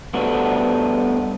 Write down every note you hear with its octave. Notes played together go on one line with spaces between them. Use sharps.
B2 G3 A3 B3 D4 F#4